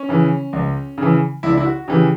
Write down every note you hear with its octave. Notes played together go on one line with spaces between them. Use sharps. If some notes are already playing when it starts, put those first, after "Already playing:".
Already playing: C#4
C#3 E3
C#2
C#3 E3
C#2 E4
D4
E4
F#4
C#3 E3 G4